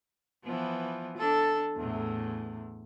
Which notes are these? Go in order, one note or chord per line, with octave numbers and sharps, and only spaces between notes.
E3 F3 B3
D4 A4
E2 A2